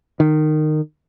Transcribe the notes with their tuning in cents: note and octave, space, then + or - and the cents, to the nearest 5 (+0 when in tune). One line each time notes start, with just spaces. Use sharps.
D#3 -20